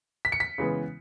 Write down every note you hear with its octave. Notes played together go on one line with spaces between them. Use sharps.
B6
C#7
B6
C#3 E3 G#3 B3